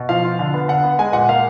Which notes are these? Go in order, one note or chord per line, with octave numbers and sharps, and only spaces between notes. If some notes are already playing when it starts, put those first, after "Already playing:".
Already playing: B2
F3 F5
F4
D3
B3
D3 F#5
B3
G#3 G#5
A#2 F#5
A#3 F5